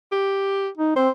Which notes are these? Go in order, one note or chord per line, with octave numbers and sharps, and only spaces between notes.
G4
D#4
C4 C5